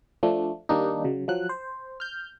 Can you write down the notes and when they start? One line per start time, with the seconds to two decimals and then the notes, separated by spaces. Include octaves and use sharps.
0.23 F3 A3 D4
0.69 D#3 G3 A#3 D4 D#4
1.04 C#3 F#3
1.28 F3 F#3 F#6
1.49 C5
2.00 F6 G6